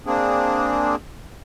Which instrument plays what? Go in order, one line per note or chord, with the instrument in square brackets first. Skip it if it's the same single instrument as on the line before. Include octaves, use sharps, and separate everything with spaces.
[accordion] A#3 C4 D4 G#4